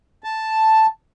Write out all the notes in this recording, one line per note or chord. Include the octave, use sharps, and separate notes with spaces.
A5